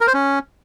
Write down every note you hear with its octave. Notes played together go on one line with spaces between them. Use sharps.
A#4
C5
C#4